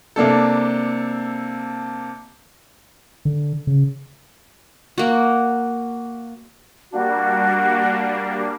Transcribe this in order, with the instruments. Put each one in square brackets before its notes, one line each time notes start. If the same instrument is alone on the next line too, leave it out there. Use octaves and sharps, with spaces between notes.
[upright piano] C3 A#3 D4 A4
[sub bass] D3
C#3
[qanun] A#3 F#4
[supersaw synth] G3 A#3 D4 [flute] F#4